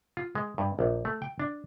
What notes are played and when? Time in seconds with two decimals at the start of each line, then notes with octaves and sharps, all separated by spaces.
0.17 F4
0.35 G#3
0.58 G2
0.79 A#1
1.05 A3
1.22 G5
1.40 D4